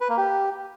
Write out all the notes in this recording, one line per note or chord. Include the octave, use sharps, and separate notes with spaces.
B4
A#3
G4